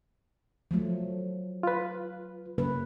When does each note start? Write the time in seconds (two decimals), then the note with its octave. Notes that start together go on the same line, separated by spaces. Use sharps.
0.71 F3 F#3 A3
1.63 F4 B4
2.58 F#2 C#3 A#3 B4